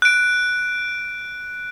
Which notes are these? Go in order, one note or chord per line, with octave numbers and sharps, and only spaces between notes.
F#6 D7